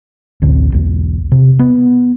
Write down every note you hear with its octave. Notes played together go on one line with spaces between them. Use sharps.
A1 D2 D3 C4
B1 E2
C3
B3